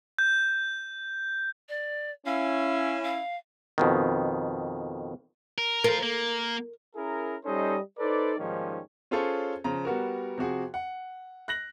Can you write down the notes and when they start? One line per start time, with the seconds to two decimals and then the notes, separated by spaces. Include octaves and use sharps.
0.19 G6
1.69 D5
2.26 C#4 E4 F5
3.03 F5
3.78 F2 B2 D#3
5.58 A#4
5.84 F4 A#4 C5
6.03 A#3
6.96 C#4 E4 G#4 A#4
7.45 G3 C#4 D#4 A4 C5 D#5
7.98 D#4 A4 B4 C5 D5
8.38 G#2 D#3 F3 G3 A#3 C#4
9.11 C#4 F4 G#4 A4 C5 C#5
9.64 C#3 F3 A#5
9.85 G3 B3 F#4 A#4
10.38 C3 F3 F#4 G#4
10.74 F#5
11.48 F#6 A#6 F#7